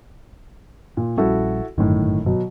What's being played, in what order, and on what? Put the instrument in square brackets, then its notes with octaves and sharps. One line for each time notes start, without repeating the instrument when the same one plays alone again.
[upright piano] A#2
[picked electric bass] A#1 G3 C#4 [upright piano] E4 F#4 A4
[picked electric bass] G1 F#2 [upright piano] A2 D#3
[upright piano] B2 F#3